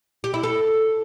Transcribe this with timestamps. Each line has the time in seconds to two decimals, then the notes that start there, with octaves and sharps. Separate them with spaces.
0.24 G4
0.34 E4
0.43 A4